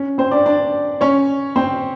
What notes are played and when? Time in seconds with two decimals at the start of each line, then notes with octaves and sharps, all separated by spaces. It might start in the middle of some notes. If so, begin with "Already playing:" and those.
Already playing: C#4
0.18 C4 C5
0.31 D4 D5
0.45 D4 D5
1.01 C#4 C#5
1.56 C4 C5